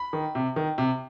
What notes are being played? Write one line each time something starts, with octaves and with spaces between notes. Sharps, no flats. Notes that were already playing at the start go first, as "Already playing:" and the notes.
Already playing: B5
D#3
C3
D#3
C3